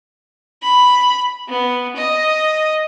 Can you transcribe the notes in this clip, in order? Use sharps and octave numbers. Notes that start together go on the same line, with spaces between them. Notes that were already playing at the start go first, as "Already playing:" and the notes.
B5
B3
D#5